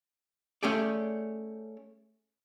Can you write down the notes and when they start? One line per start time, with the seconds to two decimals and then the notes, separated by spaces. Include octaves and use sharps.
0.63 A3 C#4 G4 G#4 D5